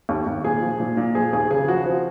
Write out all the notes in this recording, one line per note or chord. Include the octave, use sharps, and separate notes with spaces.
D#2
D#2
A#2 G#4
F3
A#2
A#2
F3 G#4
D#2 G#4
C#3 G#4
F3 F#4
F3 C4